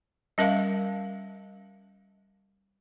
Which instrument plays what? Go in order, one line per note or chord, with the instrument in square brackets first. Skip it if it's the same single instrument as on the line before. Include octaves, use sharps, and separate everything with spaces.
[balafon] G3 C#4 A#4 E5 F5